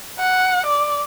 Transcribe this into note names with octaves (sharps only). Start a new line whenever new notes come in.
F#5
D5